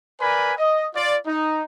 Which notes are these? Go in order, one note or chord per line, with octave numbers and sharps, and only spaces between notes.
A#4 B4 D5 G#5 B5
D#5
F4 D5
D#4